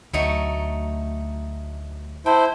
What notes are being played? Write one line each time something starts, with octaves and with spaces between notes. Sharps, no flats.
D2 F#3 A3 D#4
E4 C5 G5 A5